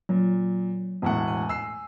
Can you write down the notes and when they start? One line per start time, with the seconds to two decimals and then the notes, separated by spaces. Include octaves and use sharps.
0.09 A#2 F#3
1.02 E1 A2 B3 F#5
1.28 G#5
1.49 E6 C7